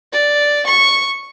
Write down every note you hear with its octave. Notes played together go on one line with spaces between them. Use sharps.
D5
C#6